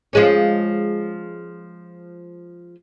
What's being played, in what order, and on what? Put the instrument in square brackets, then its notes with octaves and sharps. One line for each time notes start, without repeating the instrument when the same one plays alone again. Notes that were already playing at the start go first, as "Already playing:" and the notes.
[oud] F3 G#3 C#4